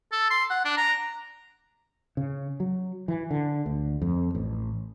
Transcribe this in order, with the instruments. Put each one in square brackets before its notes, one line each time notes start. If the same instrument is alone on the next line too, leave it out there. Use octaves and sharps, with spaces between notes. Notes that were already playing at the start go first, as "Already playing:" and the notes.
[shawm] A4
C6
F#5
D4
A#5
[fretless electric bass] C#3
F#3
E3
D3
D2
F2
A1